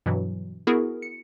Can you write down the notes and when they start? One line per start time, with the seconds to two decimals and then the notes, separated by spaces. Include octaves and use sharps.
0.06 G2 B2 E3 F#3
0.67 B3 E4 F#4 G#4 A#4
1.02 C#7